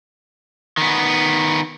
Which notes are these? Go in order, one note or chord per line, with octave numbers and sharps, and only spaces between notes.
D#3 B3